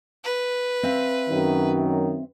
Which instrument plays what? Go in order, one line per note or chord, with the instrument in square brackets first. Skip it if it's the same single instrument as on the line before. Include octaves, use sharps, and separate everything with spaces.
[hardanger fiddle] B4
[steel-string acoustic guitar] C4 E5 F5
[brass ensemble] F#2 D#3 F#3